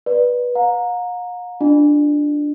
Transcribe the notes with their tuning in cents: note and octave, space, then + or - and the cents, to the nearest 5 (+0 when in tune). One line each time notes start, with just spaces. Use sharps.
B4 -10 D5 +15
F5 +45 A#5 +0
D4 +0 F4 +0 D5 +45